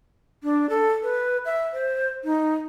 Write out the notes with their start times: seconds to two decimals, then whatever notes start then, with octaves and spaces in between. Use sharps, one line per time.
0.43 D4
0.69 A4
1.03 B4
1.45 E5
1.73 C5
2.24 D#4